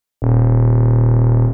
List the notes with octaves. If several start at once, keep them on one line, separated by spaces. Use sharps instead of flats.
D#1